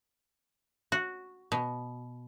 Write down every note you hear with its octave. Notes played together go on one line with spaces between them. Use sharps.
F#4
B2